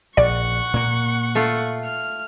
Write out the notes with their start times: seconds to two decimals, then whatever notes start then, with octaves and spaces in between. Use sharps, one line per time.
0.17 A#1 D5 F#5 C#6
0.74 A#2 A#3
1.35 A3 F4
1.85 F6